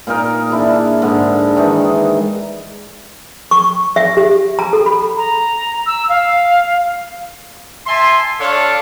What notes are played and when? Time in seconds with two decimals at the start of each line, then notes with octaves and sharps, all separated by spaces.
0.07 A#2 D#4 A#4
0.50 D4 E4 G#4
1.02 G#2 D3
1.56 D#3 E3 D4 D#4
3.51 C#6
3.96 E5
4.17 G4
4.59 A#5
4.73 A4
4.86 B5
5.17 A#5
5.86 E6
6.09 F5
7.87 E5 G#5 A5 C6
8.40 D4 A4 C#5 D5 F5